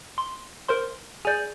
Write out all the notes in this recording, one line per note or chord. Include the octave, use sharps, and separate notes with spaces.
C6
A#4 C5 C6
G#4 D5 G#5 G6